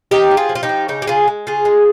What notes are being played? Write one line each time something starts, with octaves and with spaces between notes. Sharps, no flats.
C4 D#4 G4
F3
F4 G#4
F3
F4
D#4 G4
F3
C#3 D#4 G4
G4
C#3 F4 G#4
G#3
C#3 F4 G#4
G#3